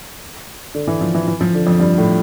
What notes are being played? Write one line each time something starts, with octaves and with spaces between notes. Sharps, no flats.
D3
E3
F3
E3
E3
F3
D3
F2
G2
A2